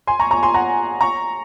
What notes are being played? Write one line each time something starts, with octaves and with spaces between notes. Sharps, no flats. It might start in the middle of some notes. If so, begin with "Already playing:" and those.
G#5 C6
A#5 C#6
A#5 C#6
G#5 C6
F#5 A#5
A#5 C#6